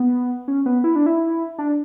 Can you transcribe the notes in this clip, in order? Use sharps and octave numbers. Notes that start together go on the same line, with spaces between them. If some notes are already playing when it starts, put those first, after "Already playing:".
Already playing: B3
C#4
B3
E4
D4
E4
D4